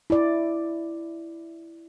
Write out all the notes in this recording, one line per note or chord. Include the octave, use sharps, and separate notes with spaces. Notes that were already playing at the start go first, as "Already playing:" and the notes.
E4 D5